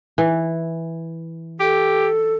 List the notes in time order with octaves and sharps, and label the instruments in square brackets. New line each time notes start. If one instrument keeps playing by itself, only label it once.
[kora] E3
[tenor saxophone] G4 [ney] A4